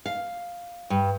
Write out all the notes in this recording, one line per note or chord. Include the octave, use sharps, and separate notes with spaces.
F5
G2